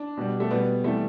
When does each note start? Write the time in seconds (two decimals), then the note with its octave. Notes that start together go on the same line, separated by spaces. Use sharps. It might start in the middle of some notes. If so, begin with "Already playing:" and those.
Already playing: D4
0.17 B2 G3
0.40 A3
0.51 B2 G3 B3
0.84 C3 E3 G3 A3